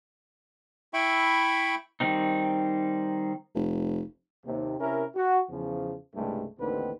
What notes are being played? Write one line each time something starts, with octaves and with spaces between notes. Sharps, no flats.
E4 E5 G5 B5 C#6
D#3 G3 C4 D#4
F1
D#2 C3
C3 C#4 E4 A#4
F#4
E2 C#3 F3
C2 G2 C#3 G#3 A3
A1 D#2 D3 D#3 C4 B4